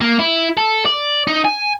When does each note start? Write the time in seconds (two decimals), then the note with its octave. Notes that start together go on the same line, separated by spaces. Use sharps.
0.01 A#3
0.19 E4
0.57 A4
0.85 D5
1.27 D#4
1.45 G#5